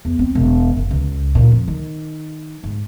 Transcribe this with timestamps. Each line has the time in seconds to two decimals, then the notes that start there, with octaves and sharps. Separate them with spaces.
0.05 E2
0.19 C4
0.35 E1
0.76 F#1
0.91 C#2
1.35 A#2
1.52 F2
1.68 D#3
2.64 G#2